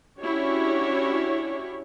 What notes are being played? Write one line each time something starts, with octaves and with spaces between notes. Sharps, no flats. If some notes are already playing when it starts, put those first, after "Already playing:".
C#4 D4 E4 F#4 G4 C#5